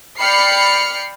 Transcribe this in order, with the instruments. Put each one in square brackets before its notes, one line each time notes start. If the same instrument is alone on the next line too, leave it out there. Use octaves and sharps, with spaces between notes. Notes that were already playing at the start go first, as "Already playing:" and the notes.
[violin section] D5 G5 B5 F6 C7 C#7